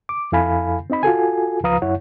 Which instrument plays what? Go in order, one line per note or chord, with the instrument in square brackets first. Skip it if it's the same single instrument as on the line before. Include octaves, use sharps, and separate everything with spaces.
[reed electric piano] D6
F2 E4 A4 F5 G#5 B5
C4 D#4 D#5 B5
F4 F#4 A4 G#5
C#2 F3 B4 F5 A#5 D#6
F#2 E4 C#5 F#5